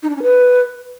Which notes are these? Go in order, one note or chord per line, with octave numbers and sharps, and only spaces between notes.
D#4
D4
C#4
B4